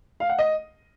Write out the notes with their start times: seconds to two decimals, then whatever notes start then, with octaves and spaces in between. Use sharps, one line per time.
0.20 F5
0.29 F#5
0.39 D#5